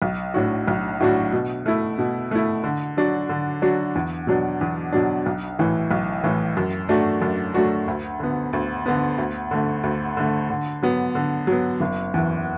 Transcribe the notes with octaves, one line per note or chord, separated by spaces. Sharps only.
B1
A2 F#3 D4 F#4
B1
A2 F#3 D4 F#4
B2
A3 E4
B2
A3 E4
D3
F#3 D4 F#4
D3
F#3 D4 F#4
E2
B2 F#3 D4
E2
B2 F#3 D4
B1
A2 E3
B1
A2 E3
F#2
F#3 A3 D4 F#4
F#2
F#3 A3 D4 F#4
D2
D3 B3
D2
D3 B3
D2
D3 A3
D2
D3 A3
D3
F#3 B3
D3
F#3 B3
F#1
E2 E3